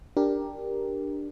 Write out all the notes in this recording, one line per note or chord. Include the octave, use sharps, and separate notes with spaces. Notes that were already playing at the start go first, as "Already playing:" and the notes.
D4 G4 A#4